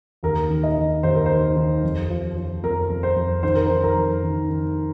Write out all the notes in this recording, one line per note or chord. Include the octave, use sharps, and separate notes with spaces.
D#2 A#4
D#3
D#5
D#3
D#2 C5
A#4
D#3 C5
D#3
F2
F3
F3
F2 A#4
F2
C5
F2
D#3 C5
A#4
D#3 C5
A#4
F2
D#3
D#3